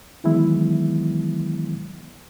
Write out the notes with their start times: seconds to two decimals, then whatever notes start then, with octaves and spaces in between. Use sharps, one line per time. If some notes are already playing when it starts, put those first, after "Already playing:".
0.24 D#3 E3 F#3 G#3 B3 E4